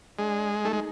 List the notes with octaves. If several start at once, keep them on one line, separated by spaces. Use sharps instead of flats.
G#3 D4
A3 D#4
G#3